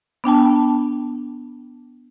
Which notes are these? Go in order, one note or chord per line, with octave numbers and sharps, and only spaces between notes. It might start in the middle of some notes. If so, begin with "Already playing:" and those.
B3 D4 G5 A5